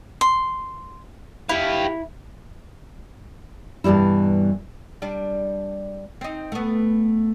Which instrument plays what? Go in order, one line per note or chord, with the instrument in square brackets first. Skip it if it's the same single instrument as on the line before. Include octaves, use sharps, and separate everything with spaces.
[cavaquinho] C6
[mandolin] E4 [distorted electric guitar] G4 F5
[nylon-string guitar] G2 B2 E3 G3 E4
[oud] G3 D4
C4 D#4
A3 B3